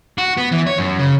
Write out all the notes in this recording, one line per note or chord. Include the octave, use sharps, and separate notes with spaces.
F#4
B3
E3
C#5
F#2
C#3